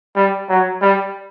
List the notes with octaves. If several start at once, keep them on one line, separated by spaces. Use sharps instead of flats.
G3
F#3
G3